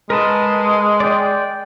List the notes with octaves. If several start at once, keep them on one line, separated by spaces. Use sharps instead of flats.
G#3 A#4 B4 A5
D5 G5